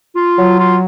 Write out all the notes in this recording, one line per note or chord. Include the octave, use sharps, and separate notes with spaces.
F4
F#3
F4